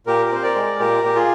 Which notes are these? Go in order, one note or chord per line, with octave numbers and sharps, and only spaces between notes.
A#2 G4 A#4
A#4
C4 C5
A#4 D5
G#3
A#2 G4 A#4
A#2 G4
F4 G#4